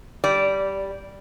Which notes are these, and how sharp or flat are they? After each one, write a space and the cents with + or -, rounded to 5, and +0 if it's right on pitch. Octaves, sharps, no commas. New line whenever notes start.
G3 +0 D5 -15